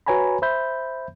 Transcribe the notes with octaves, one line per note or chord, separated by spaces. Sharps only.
F#4 B4 C#5 G#5 A#5 B5
C5 E5 B5 G6